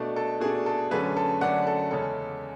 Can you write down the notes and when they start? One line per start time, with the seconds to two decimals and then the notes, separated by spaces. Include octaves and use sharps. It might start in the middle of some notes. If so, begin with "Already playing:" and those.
Already playing: B2 A3 D4
0.16 A4
0.40 B2 A3 D4 G#4
0.66 A4
0.91 F#2 D3 A3 C#4 G#4 B4
1.17 A4
1.41 F#2 D3 A3 C#4 D5 F#5
1.67 A4
1.91 E2 C#3 G#3 C#4 A4